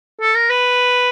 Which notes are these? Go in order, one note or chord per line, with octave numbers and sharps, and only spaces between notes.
A4
A#4
B4